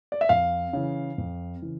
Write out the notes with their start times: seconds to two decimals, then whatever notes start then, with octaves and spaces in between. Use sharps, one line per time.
0.12 D5
0.21 E5
0.29 F2 F5
0.73 C#3 E3
1.18 F2
1.62 C#3 E3